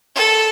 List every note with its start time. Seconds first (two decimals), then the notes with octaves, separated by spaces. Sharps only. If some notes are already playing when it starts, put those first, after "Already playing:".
0.16 A4